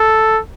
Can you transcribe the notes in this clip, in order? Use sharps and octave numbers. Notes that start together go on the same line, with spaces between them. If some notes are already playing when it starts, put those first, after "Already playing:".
Already playing: A4